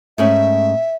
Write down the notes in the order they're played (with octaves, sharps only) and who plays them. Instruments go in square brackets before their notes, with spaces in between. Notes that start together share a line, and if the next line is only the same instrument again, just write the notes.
[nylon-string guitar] G#2 A3 C#4 [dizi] E5